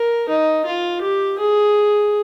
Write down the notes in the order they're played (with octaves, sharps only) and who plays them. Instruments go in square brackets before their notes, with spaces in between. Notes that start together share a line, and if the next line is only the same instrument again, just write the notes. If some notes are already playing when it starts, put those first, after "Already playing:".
Already playing: [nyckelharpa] A#4
D#4
F4
G4
G#4